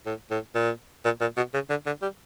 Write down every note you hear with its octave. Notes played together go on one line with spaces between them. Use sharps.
A2
A2
A#2
A#2
A#2
B2
C#3
D3
D3
G3